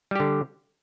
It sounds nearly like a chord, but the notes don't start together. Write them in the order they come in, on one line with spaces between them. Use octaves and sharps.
G3 G4 D3